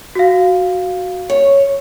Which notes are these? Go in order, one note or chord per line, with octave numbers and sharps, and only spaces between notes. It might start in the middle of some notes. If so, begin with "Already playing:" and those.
F#4 F5
C#5